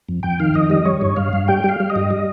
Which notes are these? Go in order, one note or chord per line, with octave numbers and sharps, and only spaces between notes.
F2
F2 G5
D#3 F5
F2 D#5
G3 D#5
G3 C#5
G2
G2 F5
G2
G3 G5
G3 F5
G3
D#5
G2
G3